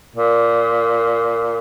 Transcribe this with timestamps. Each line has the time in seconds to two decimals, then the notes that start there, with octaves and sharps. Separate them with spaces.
0.15 A#2